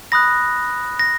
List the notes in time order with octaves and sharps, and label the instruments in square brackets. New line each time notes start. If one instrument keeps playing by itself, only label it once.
[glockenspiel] B5 D#6 F#6 A#6
A#6